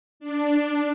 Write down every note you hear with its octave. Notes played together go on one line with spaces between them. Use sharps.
D4